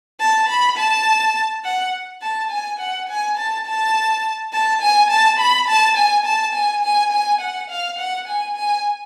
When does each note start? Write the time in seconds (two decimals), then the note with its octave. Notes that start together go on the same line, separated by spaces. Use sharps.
0.20 A5
0.49 B5
0.77 A5
1.64 F#5
2.22 A5
2.51 G#5
2.80 F#5
3.09 G#5
3.37 A5
3.66 A5
4.53 A5
4.81 G#5
5.10 A5
5.39 B5
5.68 A5
5.97 G#5
6.26 A5
6.54 G#5
6.83 G#5
7.12 G#5
7.41 F#5
7.70 F5
7.99 F#5
8.28 G#5
8.56 G#5